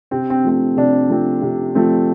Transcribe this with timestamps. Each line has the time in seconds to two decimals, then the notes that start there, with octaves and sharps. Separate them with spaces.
0.11 C3 C4
0.30 C4
0.44 F3 A3 C4
0.77 C3 D4
1.10 F3 A3 C4
1.42 C3
1.75 F3 A3 C4